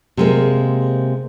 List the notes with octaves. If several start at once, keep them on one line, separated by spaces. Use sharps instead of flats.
C3 G#3 A#3